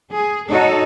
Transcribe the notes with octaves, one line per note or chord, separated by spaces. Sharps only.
G#4
D#4 F#4 A4 C#5